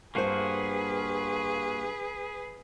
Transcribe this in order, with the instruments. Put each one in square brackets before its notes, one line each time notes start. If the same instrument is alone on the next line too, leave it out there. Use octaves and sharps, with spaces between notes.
[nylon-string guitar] G2 C5 [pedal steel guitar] A#3 F4 F#4 [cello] G#4 B4